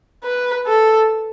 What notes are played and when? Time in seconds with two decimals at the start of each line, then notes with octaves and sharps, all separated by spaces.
0.24 B4
0.67 A4